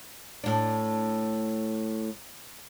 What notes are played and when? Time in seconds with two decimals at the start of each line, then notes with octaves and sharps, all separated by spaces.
0.44 A2 D4